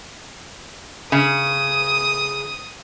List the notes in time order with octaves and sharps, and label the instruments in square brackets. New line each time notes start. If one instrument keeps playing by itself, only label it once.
[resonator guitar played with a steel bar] C#3 [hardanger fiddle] D#6